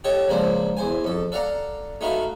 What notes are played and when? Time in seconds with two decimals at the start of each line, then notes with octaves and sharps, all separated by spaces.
0.04 G4 A4 C#5 D#5 G5 A5
0.28 C#2 F3 A#3 D4 C5
0.77 E2 C5 G#5
1.04 F2 A4
1.32 A4 D5 F5 F#5 A#5
2.01 A3 D#4 F#4 B4 F5 B5